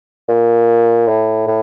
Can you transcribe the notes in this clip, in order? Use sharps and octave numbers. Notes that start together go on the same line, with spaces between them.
A#2
A2
A2